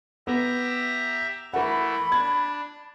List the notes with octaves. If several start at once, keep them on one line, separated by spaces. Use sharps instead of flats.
B3 G4 E5 A#5
E3 A3 A#4 F#5 B5
D4 G#6